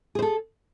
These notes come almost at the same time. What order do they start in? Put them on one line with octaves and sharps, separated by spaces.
G#4 C5 A4